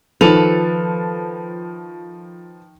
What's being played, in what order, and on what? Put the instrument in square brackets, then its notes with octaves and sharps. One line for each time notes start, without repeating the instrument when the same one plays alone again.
[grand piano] D#3 F7 [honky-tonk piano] F3 [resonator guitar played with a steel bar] A4 B4